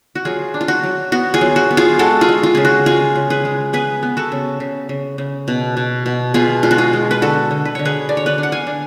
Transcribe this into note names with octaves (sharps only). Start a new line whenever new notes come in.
F#4
F#3 F4 G#4
D4
F4
F#4
F#3
B3 F#4
F4 G#4
F#3
F#4
B3
F4 G#4
G#3 F#4 A4
F4 G#4
G#3
F4
C#3 G#4
F#4
G#3 F4 G#4
C#3
G#4 B4
G#3
B3 G#4 B4
B3
F#4 A4
C#3
C#3
C#3
C#3
B2
B2
B2
B2 F4 G#4
G#3 F4
F#4
F4 G#4
G#3
B4
D3 F#4 A4
D3
B4
D3 C#5
G#4 B4
D3 D5
C#5
B4 D5
D4
F#5
F5 G#5
D4